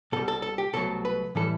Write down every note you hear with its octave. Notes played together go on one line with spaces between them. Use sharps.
C2 B2 G3 A4
A4
A4
G4
C2 B2 F#3 A3 A4
B4
A2 E3 G3 A4